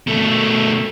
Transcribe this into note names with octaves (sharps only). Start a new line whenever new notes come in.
B2 A3